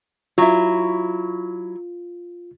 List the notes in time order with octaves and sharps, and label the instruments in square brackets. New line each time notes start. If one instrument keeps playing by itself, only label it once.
[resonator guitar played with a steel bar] F#3 E4 [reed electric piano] F4